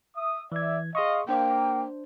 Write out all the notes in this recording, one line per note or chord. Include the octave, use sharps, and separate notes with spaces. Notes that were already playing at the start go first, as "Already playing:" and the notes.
E5 D#6
E3 D5 E5 G#6
G#4 D#5 F5 C6 C#6
A#3 D4 C5 G5